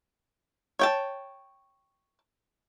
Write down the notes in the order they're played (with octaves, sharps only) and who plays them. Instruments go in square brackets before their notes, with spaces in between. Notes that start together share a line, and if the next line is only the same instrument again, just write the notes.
[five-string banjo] C#5 G5 A5